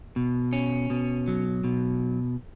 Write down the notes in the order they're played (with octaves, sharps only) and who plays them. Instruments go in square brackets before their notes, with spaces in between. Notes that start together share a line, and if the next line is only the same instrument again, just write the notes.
[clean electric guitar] B2
C#4
B2
F#3
B2